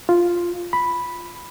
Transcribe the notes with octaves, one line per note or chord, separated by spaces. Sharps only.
F4
B5